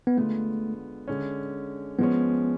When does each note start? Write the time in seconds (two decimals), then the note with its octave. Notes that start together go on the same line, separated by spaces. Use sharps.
0.07 B3
0.17 D3 G#3 A3 B3 F4
1.07 D3 G#3 C#4
1.99 F3 G#3 B3 C#4